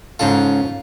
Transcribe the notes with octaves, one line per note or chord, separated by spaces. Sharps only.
G#2 C#3 F4 A4 A5